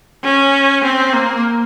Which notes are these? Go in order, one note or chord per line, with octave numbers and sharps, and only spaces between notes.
C#4
C4
A#3